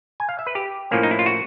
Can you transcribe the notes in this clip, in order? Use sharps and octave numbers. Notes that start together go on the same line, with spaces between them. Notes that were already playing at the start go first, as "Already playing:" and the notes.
G#5
F5
E5
B4
G4
A2 F3 A#3 C#4
D#4
E4
F4
F#4